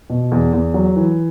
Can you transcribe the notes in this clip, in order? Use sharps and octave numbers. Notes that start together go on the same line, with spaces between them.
B2
E2
E2
F#3
E3